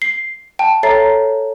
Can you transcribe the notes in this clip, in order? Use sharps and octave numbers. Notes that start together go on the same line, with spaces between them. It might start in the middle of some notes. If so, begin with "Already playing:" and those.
C7
G5 A5
A4 C#5 E5 A#5 A6 C7